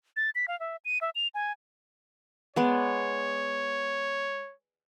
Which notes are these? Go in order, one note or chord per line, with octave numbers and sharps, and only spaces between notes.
A6
B6
F5
E5
D#7
E5
F7
G#5
G#3 B3 C#5 D5